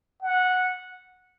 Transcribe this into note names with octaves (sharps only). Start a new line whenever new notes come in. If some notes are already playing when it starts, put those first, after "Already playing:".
F#5